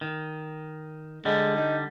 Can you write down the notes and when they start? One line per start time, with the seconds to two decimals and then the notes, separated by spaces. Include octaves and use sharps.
0.01 D#3
1.25 D3 G3 G#3
1.56 D#4